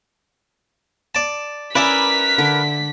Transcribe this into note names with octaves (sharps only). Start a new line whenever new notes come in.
D5 A5
C#4 E4 A#4 B4 D5 E5 D6 B6
D3 D6